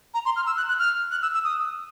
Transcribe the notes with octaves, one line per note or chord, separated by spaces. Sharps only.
A#5
C6
F6
E6
F#6
F#6
F6
F#6
E6
E6
D#6